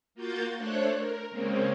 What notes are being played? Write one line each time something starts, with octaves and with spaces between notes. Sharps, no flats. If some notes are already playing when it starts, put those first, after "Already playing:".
A#3 F4 F#4 G6 A6
A3 D4 A4 C5 C#5 F#6
A#4
C#3 G#3 A#3 C4 C#4